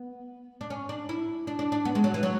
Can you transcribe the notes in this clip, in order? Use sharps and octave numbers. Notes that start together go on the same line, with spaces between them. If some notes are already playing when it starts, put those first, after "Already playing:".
Already playing: B3
D4
C#4
D4
E4
D4
D4
D4
B3
G#3
F#3
E3
F#3